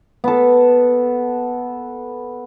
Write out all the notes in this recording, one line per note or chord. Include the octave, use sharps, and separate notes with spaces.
B3 A4